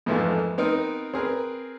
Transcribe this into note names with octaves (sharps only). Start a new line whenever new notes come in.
F2 G#2 E3 F3 A3 A#3
B3 C4 D#4 A#4
C4 G#4 A#4 B4